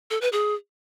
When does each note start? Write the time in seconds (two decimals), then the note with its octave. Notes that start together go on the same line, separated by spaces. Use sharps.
0.10 A4
0.21 B4
0.32 G#4